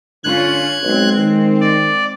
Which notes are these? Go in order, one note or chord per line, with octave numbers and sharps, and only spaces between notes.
D3 C#4 F4 F#6 G#6
B1 G#3 C4
D#3
D5